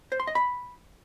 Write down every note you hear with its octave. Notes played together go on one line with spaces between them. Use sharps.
C5
C6
D#5
B5